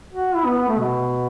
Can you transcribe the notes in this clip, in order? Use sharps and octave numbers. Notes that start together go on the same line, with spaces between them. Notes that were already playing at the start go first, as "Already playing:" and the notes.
F#4
E4
B3
B3
A3
B2